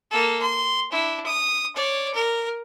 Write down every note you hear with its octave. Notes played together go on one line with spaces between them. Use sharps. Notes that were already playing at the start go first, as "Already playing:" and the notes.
A#3 A4
C6
D4 E4
D#6
C#5 D5
A#4